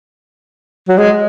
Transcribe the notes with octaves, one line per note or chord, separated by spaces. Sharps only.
F#3
G#3